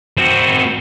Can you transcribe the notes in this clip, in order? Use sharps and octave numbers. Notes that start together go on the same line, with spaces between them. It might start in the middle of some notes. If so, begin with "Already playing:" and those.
C4 F#4